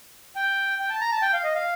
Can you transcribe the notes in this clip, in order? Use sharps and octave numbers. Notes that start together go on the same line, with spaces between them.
G5
G5
A5
A#5
A5
G5
F5
D#5
F5